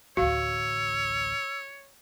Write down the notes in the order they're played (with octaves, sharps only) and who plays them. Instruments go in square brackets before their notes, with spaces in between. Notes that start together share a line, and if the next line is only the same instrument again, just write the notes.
[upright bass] A1 D2 [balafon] F#4 F5 [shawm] C#5 [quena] E6